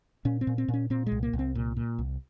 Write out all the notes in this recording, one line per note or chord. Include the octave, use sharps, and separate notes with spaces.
A#2 C#4
C4
A#2
C4
A#2
C#4
A#2 C4
G#3
C2
A#3
C2
C4
A#2
A#2
C2